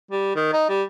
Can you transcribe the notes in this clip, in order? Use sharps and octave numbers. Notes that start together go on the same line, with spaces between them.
G3
D#3
D#4
G3